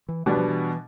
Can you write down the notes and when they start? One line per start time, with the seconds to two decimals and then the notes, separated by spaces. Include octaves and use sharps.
0.09 E3
0.26 B2 E3 G3 B3 D4
0.37 F3
0.48 E3